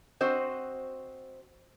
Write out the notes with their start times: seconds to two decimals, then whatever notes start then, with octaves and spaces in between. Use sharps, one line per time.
0.21 C4 F#4 C5 D#5